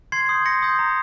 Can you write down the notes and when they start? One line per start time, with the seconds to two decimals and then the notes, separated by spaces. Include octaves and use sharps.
0.12 C6 G#6 C7
0.29 D#6 G6
0.45 C6 A#6 C#7
0.62 D#6 G6
0.79 A#5